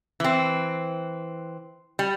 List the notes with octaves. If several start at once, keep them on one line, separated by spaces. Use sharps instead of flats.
E3 C4
G3